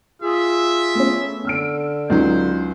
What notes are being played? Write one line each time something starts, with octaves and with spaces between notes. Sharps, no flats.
F4 G#4 E5
A3 B3 C#4
D3 E6 F6 D7
C#2 F#3 D#4 C5